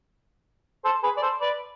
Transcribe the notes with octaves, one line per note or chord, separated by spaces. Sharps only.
A4 C5
G#4 B4
D5
A4 C5
B4 D5